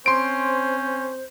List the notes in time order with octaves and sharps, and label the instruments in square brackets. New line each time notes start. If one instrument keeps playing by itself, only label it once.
[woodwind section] C4 C5 [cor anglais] C#4 [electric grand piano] C6 D7